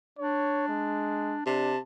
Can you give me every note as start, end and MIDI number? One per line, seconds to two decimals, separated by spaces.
0.19 1.44 62
0.19 0.68 73
0.68 1.37 56
1.46 1.77 48
1.46 1.73 62
1.46 1.78 81